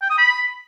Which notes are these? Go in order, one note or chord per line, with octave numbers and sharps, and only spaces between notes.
G5
D#6
B5